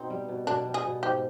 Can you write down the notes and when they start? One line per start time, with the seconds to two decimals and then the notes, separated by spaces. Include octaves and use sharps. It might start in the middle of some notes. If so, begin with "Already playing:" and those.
Already playing: B2 C4 D#4
0.10 G3
0.28 B2
0.47 B2 D4
0.65 G3
0.74 G#4
0.84 B2
1.03 G#2 G4